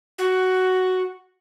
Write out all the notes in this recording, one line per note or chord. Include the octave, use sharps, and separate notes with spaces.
F#4